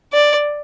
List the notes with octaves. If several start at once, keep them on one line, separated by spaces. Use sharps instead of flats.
D5